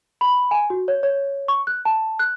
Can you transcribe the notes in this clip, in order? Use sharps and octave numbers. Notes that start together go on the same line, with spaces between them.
B5
G#5
F#4
C#5
C#5
C#6
F#6
A5
F#6